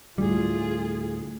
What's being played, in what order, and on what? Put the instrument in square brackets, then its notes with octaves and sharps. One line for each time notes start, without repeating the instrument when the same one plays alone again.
[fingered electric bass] D2 A2 [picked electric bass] G3 [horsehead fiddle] F4 G#4